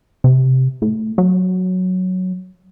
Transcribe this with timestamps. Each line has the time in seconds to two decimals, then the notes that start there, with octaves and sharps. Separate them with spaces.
0.24 C3
0.82 A2
1.18 F#3